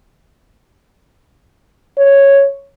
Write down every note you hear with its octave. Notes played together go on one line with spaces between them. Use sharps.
C#5